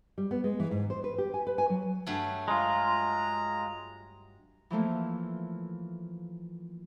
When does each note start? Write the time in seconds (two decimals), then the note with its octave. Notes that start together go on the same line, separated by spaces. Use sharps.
0.18 G3
0.31 B3
0.44 G#3
0.60 E3
0.71 G#2
0.90 C5
1.04 B4
1.18 G4
1.34 G#5
1.47 B4
1.58 G#5
1.70 F#3
2.07 G2 F#3 A3
2.48 G#3 F4 A#5
4.70 E3 F3 A3 A#3